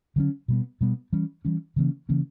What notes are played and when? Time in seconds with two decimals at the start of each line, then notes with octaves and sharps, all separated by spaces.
0.16 D3 F#3 A#3 C#4
0.48 B2 G3 B3
0.81 B2 G3 B3
1.13 E3 G3 C#4
1.45 E3 G3 C#4
1.76 C#3 E3 A#3 C#4
2.09 C#3 E3 A#3 C#4